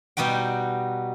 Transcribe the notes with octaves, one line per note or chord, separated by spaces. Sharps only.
B2 G3 D#4 F#4 G5